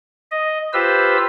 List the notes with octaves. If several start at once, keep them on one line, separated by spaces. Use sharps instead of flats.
D#5
F4 G4 B4 C5 E6